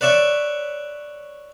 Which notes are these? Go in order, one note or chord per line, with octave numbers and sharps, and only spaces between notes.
B4 C#5 D5 E5 C#6